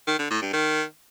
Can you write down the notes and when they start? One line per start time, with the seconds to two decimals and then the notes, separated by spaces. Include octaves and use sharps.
0.07 D#3
0.19 D3
0.30 A2
0.42 G2
0.53 D#3